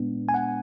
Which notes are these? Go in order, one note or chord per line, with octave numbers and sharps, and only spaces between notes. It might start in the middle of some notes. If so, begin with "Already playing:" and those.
Already playing: A#2 G#3 B3 D4
G#5
F#5